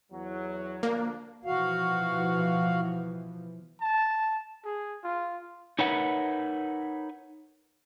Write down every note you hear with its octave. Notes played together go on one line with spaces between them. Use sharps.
E2 F#3
D2 F3 A#3 D4
B2 E3 F3 F#4 F5
A5
G#4
F4
D#4 A#4 B4 C#5 E5 F#5